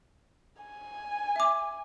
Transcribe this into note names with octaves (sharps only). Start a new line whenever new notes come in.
G#5
E5 D6